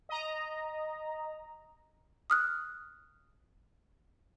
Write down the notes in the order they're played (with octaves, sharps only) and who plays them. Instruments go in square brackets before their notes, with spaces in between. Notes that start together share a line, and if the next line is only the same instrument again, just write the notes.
[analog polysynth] D#5 A#5
[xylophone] D#6 F6 F#6